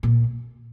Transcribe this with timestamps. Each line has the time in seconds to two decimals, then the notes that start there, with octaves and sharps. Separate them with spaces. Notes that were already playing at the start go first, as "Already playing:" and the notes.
0.03 A#2